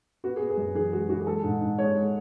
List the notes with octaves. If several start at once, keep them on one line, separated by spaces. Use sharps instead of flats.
B3 F#4
B3 G#4
G#4
F#2
E3 G#4
G#3 F#4
E3 F#4
G#4
G#3 A4
G#2
G#2
G#3 C#5
G#3